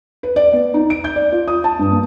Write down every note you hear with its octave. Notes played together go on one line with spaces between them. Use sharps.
B4
D5
B3
D#4
D7
G6
D5
F4
D#6
A5
G2
A#3